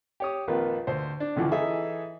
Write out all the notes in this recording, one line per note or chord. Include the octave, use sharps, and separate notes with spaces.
G4 C#5 D#6
A#1 F2 D#3 A#3 F4 B4
D2 C5
D4
C#2 F#2 D3 E3 F3
E3 D#4 G#4 A4 E5